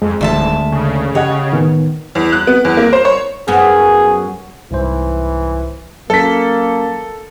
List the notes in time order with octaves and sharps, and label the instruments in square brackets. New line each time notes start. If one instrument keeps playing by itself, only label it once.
[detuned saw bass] F2 [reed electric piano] G#3
[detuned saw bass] D#1 [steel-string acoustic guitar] D2 E5 A5
[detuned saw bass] C#3
[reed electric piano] G4 D#5 F#5 [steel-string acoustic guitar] C#5
[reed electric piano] A2 D#3 B3
[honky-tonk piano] E2
F#6
B3
E2
A#3
C5
C#5
[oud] F#2 F#3 B3 [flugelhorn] G#4
[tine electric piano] C2 G#2 C5 [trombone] E3
[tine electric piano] F#3 C#4 [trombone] A#3 [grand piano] A4 B6